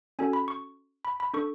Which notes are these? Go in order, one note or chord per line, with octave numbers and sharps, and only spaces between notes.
C#4 F#4 A4 G#5
B5
C#6
B5
B5
D4 A4 C#6